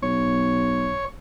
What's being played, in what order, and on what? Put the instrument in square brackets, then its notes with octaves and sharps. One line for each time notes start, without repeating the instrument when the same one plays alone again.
[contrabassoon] B1 [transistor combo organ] C#5